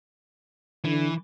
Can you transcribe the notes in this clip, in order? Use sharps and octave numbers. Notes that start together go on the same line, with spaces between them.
D3 E3